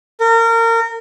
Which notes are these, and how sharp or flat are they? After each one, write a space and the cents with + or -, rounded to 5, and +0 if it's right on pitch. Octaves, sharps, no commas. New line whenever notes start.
A#4 -30